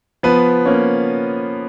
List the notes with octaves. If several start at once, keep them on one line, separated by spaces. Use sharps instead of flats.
F3 B3 B4
A#3 C#4